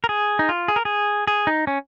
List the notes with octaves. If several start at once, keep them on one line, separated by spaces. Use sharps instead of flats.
A#4
G#4
D#4
F4
G#4
A#4
G#4
G#4
D#4
C#4